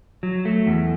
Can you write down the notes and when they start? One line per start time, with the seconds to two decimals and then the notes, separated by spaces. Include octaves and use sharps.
0.23 F#3
0.45 A3
0.66 E2